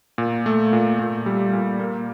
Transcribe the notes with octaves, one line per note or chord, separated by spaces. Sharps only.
A#2
A3
A#2
A#2
G3
A#2
A#3